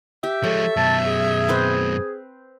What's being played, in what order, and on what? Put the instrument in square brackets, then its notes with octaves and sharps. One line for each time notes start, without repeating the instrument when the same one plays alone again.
[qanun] G4 [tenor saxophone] E5
[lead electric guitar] F3 G#3 [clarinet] A4 [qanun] C#5
[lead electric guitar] F#2 B2 [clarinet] A5
[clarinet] G#4
[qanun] C4 B4 C5